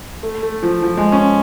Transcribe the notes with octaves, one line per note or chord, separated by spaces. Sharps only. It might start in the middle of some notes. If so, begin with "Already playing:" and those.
A3
A3
F3
F3
G#3
C#4